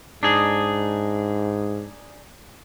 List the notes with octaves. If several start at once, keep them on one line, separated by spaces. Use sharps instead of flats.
G#2 D4 D#4 G#4